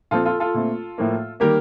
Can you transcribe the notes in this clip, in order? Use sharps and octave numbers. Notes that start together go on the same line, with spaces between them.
A#2 F3 C4 F4 A4
F4 A4
F4 A4
A#2 A3 C4
A2 F3 A#3
D#3 G3 A#3 G4 A#4